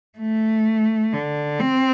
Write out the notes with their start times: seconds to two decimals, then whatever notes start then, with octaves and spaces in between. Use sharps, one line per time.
0.19 A3
1.13 D3
1.60 C4